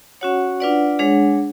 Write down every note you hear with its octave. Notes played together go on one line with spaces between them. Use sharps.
C#4 F#4 C#5 F#5
D4 F4 B4 D5 F#5
G#3 D4 G#4 C#5 F#5